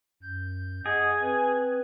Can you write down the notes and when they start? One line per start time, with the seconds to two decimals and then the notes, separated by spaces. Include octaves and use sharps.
0.23 F#2 G6
0.86 G#4 D#5 F#5 D#6
1.21 C4 B4